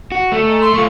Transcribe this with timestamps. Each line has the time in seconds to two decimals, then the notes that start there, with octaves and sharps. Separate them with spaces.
0.12 F#4
0.32 A3
0.46 D#4 G#4
0.61 E5 C6
0.74 A3 F4 C#6